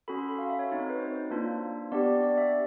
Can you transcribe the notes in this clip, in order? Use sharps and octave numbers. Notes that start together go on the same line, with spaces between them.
C#4 F#4 A4 B5
C6
B5
F5
E5
C#5
C4 D#4 F#4 C#5
C#5
B4
C5
C5
A#3 D4 F4
B3 D4 G4 D5
D5
E5